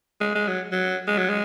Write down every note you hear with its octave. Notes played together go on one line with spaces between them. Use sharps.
G#3
G#3
F#3
F#3
G#3
F#3
G#3